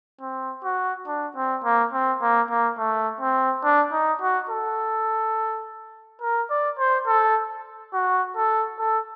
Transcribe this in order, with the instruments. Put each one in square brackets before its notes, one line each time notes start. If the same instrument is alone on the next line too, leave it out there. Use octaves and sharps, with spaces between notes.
[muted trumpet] C4
F#4
D4
C4
A#3
C4
A#3
A#3
A3
C4
D4
D#4
F#4
A4
A#4
D5
C5
A4
F#4
A4
A4